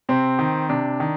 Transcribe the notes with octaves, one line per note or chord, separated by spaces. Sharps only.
C3 C4
D#3
C3 D4
D#3